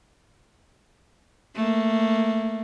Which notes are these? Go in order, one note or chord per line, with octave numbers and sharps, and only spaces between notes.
A3 A#3